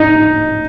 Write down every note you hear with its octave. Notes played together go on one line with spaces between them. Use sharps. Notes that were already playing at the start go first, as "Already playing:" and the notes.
Already playing: D#4